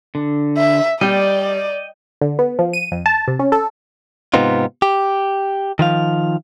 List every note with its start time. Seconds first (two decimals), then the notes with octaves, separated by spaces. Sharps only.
0.15 D3
0.57 E5
1.01 G3 D5 D#5 G5
2.21 D3
2.39 B3
2.59 F3
2.73 D#7
2.92 F2
3.06 A5
3.28 C3
3.39 C#4
3.52 A4
4.34 G#2 C3 B3 C4 D#4 F4
4.82 G4
5.79 D#3 F3 F5